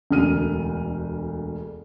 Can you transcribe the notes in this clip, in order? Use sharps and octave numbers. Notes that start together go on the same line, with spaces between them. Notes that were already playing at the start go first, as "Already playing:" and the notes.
E1 D2 F6 D#7